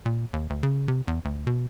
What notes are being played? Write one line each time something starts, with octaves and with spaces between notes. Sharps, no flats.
A#2
D#2
D2
C#3
C3
E2
D2
B2